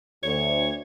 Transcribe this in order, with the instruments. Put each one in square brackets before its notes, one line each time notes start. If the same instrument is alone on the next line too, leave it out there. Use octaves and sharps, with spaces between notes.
[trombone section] D2 [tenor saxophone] C#5